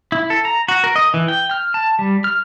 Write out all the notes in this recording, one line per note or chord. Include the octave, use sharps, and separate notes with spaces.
E4
A4
A#5
F#4
A#4
D#5
E3
G5
F6
A5
G3
F6